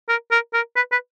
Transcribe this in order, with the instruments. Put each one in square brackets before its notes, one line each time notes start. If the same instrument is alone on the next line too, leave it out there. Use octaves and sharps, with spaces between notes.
[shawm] A#4
A#4
A#4
B4
B4